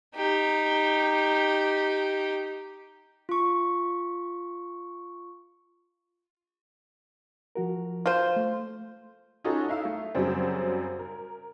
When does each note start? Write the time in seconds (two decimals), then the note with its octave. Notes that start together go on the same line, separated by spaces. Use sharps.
0.15 D#4 G4
3.29 F4 C#6
7.55 F3 F#4 A#4
8.06 F4 C5
8.36 A3
9.44 C#4 D#4 F4 F#4 A4
9.68 D#4 E4 F5 E6
9.85 A3
10.15 F#2 C#3 F#3 G3 C4
10.99 A#4